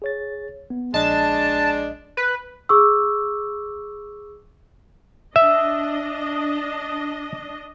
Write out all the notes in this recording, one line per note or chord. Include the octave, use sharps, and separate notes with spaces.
G#4 C#5 A6
B3
A#1 G#3 D4 D#5 A5
B4
G#4 C#6 D6 E6
D4 D#5 E5